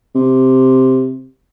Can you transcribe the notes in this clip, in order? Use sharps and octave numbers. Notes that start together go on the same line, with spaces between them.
C3